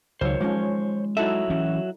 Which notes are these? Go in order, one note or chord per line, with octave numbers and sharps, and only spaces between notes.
C#2 D#3 F#3 C5 C#5
F3 G#3 C#4
F#3 D#4 E4 F#4 A4 E5
E3 C#4